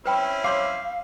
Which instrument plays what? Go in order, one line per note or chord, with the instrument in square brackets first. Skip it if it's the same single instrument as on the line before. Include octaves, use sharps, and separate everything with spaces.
[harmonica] C4 C#4 E4 [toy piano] B4 G5 B5
[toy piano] C#5 C6 D6 [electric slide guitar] F5